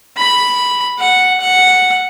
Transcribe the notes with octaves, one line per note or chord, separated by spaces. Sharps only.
B5
F#5
F#5